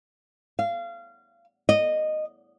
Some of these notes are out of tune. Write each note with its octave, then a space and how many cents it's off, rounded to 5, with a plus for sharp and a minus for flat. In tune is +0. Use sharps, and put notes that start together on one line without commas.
F5 -25
D#5 -10